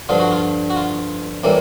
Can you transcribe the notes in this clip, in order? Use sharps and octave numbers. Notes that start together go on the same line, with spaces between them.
G2 D3 F3 F4
F#4
F4
F#4
F4
A2 E3 G3 A#3